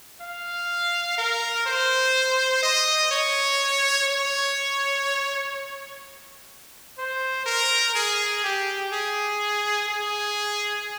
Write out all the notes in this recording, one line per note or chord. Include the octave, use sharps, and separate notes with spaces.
F5
A#4
C5
D#5
C#5
C#5
C5
A#4
G#4
G4
G#4
G#4